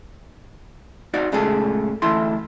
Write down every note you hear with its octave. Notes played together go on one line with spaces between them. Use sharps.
D#4 F#4 D5 F5
A#2 C#3 G#3 A3 G#4 A4
D2 E3 A3 E4 C6